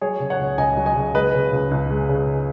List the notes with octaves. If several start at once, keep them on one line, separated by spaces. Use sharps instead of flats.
F#3 G#4 C#5
C#3
C#5 F#5
C#2
C#2 D#5 G#5
F#3
D#5 G#5
C#3
G#3 B4 D#5
C#3
C#2
C#2
G#3
C#3